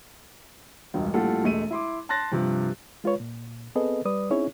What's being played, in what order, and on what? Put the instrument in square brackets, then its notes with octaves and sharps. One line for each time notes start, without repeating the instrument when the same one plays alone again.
[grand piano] E1 C#2 G2
A#1 A2 G3 F4 A4 F#5
E1 G#3 A3 D#7
E4 C6 D6
A5 C6 F#6 A6 A#6
G2 C3 F3
[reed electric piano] G#3 F4 B4 C#5
A#2
B3 C4 G#4 A4 B4 D#5
G3 B4 D5 D#6
C4 C#4 D#4 E4 G#4 C#5